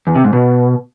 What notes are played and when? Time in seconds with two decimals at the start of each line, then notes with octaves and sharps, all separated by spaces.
0.07 E2
0.16 C3
0.24 G#2
0.33 B2